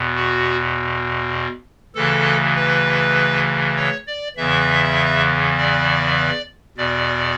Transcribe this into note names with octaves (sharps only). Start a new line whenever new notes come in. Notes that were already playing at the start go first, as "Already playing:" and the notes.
Already playing: E2 B2
F#4
D2 C#3 E3 A4
B4
C#5
D5
E2 C#3 E3 E5
D5
E2 B2 D5